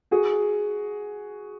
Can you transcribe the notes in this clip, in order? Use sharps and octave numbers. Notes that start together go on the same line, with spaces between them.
F#4 G#4